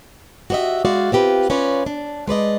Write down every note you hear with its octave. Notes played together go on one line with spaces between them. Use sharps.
F#4 G4 C5 D#5 E5
G#3 F#4 A4 D5 F5
C4 F4 G4 B4
C#4 F4 B4 C#5 D5
D4
G#3 B4 D5 D#5